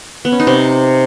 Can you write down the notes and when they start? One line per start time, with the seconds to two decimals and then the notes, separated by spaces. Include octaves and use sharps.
0.25 B3
0.32 C#4
0.40 D#4
0.47 C3